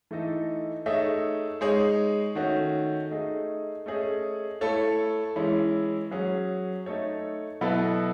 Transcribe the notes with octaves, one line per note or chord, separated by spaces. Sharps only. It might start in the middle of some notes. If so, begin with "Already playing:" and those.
E3 A3 D#4 A4 D#5
A3 D#4 G#4 C#5 E5
G#3 D#4 G#4 C#5
D#3 A3 C#4 F#4
A3 D#4 G#4 D#5
A3 C#4 G#4 D#5
A3 E4 A4 C#5
E3 G#3 C#4 E4
F#3 C#4 G#4
A3 D#4 A4 C#5
B2 F#3 B3 E4 A4